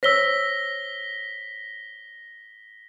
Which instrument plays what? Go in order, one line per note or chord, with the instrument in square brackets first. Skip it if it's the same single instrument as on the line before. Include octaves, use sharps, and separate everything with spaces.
[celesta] C5 C#5 E6 [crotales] A#6 B6 G7